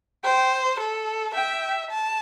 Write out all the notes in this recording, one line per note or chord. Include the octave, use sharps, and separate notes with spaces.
C5 G5
A4
E5 G5
A5